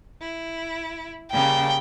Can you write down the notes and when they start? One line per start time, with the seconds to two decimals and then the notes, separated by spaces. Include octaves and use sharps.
0.20 E4
1.32 C#3 G3 A#3 G5